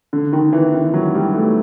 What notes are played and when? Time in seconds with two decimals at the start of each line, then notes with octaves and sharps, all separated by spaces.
0.13 D3
0.33 D#3
0.53 E3
0.74 D#3
0.94 F#3
1.15 G3
1.34 A3